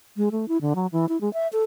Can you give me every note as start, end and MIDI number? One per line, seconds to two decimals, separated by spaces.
0.17 0.29 56
0.32 0.48 57
0.48 0.57 64
0.61 0.73 50
0.75 0.87 54
0.92 1.08 52
1.09 1.20 64
1.21 1.32 56
1.34 1.48 76
1.53 1.64 69